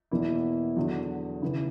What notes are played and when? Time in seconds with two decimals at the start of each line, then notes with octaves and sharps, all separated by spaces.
0.11 E2 B2 A#3 E4
0.76 E2 D3 F#3
1.42 C#3 E3 B3